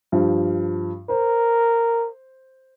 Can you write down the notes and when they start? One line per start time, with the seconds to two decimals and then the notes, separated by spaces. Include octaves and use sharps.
0.12 G2 F3
1.09 A#4 C5